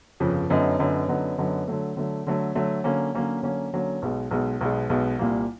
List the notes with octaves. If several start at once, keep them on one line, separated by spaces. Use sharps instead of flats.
G1 F2 C#3 F3
F#2 D3 F#3 B3 D#4
F#2 D3 F#3 B3 D#4
F#2 D3 F#3 B3 D#4
F#2 D3 F#3 B3 D#4
D3 F#3 A3
D3 F#3 A3
D3 F#3 A3
D3 F#3 A3
D3 F#3 A#3 C#4
D3 F#3 A#3 C#4
D3 F#3 A#3 C#4
D3 F#3 A#3 C#4
B1 B2 G#3
B1 B2 G#3
B1 B2 G#3
B1 B2 G#3
C2 A#2 G3 A#3